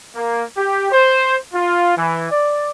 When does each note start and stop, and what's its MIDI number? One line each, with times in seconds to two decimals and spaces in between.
0.16 0.44 58
0.57 0.90 67
0.91 1.36 72
1.53 1.95 65
1.97 2.29 52
2.31 2.70 74